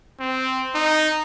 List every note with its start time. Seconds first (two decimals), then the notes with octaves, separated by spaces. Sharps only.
0.20 C4
0.75 D#4